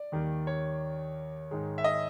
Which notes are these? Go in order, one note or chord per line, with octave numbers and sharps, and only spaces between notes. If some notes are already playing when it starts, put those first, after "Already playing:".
Already playing: D5
D#2 D#3 G3 A#3
C#5
G#2 D#3 G#3
E5
D#5